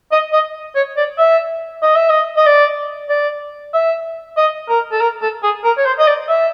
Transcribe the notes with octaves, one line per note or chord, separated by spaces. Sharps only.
D#5
D#5
C#5
D5
E5
D#5
E5
D#5
D#5
D5
D5
E5
D#5
A#4
A4
A#4
A4
G#4
A#4
C#5
C5
D#5
D5
E5